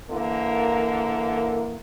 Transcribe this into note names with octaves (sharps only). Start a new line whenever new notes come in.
D3 E3 A#3